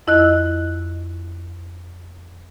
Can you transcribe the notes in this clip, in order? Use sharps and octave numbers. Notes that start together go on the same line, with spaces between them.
F2 E4 D#5 E6 F#6